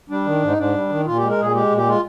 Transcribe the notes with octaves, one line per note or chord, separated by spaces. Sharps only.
G3 D4
D#3
G#2 D#4
G#2 D4
G3
D#3
A#2 F4
G4
G#3
A#4
A#2 G#4
G#3 G4
A#2
G4
G#3 F4